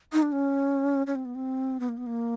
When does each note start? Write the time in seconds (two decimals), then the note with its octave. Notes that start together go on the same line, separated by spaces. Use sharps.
0.13 D#4
0.22 D4
0.32 C#4
1.07 C#4
1.15 C4
1.25 B3
1.35 C4
1.80 B3
1.89 A#3
1.97 B3
2.07 A#3